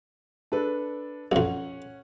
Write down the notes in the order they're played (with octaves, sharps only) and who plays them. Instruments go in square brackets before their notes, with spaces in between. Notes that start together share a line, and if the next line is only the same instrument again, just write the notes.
[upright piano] D4 A4 B4
[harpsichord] B1 F2 [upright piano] C#4 F#5